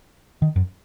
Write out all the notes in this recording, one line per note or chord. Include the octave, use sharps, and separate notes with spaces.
D#3
F#2